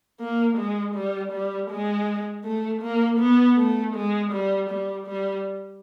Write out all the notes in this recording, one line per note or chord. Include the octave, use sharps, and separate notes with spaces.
A#3
G#3
G3
G3
G#3
A3
A#3
B3
A3
G#3
G3
G3
G3